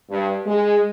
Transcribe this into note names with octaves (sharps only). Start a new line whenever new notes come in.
G2
G#3